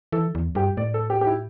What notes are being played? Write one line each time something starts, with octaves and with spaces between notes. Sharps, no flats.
E3 A4
E2
G2 G4
A2 D5
A4
G4
G4
E4